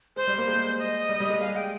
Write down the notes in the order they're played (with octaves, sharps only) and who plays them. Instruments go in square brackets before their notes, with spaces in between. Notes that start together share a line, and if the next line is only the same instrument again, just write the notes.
[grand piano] G#3 [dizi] C5
[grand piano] G3
A#3
G#3
[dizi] D#5
[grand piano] G3
G3
G#3
[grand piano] G#3 [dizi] F5
[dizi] G5